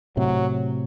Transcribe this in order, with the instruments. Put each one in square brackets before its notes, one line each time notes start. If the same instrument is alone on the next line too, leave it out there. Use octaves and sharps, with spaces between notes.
[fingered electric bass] A2 C3 [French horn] F#3